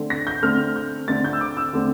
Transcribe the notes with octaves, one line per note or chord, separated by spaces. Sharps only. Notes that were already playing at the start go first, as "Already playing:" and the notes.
Already playing: D3 A3 C4
A#6
G6
D3 A3 C4 F6
G6
D3 A3 C4 A6
G6
E6
D6
E6
D3 A3 C4